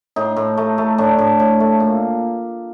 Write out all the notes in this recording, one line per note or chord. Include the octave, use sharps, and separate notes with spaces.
A2 D#4
A2
A3
A3
A2 D4
A2
A2
A3
A#2